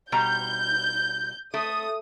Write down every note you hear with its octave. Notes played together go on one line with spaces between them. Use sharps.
B2 G3 A#5 G6
A3 D#6